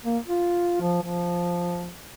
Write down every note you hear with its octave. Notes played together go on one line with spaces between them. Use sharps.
A#3
F4
F3
F3